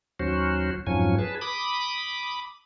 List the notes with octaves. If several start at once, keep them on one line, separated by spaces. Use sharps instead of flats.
D#2 F#3 C#4 F#4 C5
F2 G#2 F3 F#3 C#4 G#5
G#4 B4 A5
B5 D6 D#6